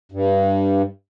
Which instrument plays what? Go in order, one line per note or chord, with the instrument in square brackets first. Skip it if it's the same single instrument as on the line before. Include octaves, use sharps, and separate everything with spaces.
[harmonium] G2